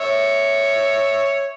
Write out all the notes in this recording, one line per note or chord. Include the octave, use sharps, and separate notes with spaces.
C#5 E5